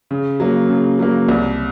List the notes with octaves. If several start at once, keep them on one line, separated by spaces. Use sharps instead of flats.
C#3
F#3 A#3
C#3
F#3 A#3
C2